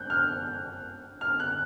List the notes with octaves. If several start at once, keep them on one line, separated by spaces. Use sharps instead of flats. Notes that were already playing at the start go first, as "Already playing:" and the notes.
Already playing: F#6 G6
F6
F6
F#6